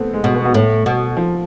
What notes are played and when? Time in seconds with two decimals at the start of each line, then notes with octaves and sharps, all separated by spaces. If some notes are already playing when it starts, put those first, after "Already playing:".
Already playing: A3 B3 C4
0.13 G#3
0.24 B2
0.34 B3
0.45 B3
0.54 A2 A3
0.86 B2
1.17 F3